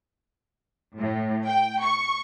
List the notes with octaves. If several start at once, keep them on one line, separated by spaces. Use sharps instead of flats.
A2
G5
C#6